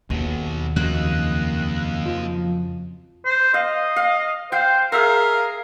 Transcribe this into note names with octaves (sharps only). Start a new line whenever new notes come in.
D#2 B2 F#3
F2 C#3 F#3 A#3 D#4 F#6
F3
C5
D#5 F5
F5
C5 F5 G5
G#4 A#4 E5 F5